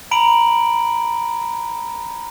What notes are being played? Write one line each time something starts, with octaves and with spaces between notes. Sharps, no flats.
A#5 B5 D7 F#7